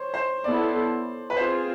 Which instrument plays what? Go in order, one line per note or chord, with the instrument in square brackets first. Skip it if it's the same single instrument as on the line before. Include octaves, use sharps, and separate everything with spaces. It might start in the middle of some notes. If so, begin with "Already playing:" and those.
Already playing: [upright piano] C5 C#5
C5
[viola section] B3 E4 A4 [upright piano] D5
[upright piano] B4
[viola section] C4 F4 G#4 [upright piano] C5